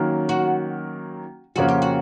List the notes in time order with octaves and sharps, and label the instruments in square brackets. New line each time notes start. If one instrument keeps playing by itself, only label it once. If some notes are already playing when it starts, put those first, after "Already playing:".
Already playing: [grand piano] D#3 F#3 A#3 C#4
[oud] F#4
[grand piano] F2 C#3 F3 A#3 C#4 [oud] F#4
[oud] G4
F#4